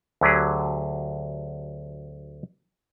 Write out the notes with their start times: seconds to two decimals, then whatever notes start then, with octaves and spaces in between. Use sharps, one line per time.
0.21 D2 D3 F#3 G4 G#4